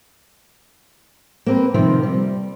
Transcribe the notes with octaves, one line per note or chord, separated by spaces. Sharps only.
A#3 C4 B4
C3 D#3 F3 A#3 C4
G3